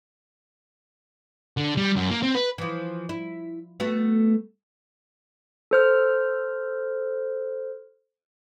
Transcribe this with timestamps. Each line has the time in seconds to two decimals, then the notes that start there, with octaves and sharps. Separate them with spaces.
1.57 D3
1.77 G3
1.96 F#2
2.11 A#3
2.23 C4
2.35 B4
2.58 E3 F3
3.09 E4
3.80 A3 B3 F#4
5.71 A4 C5 F6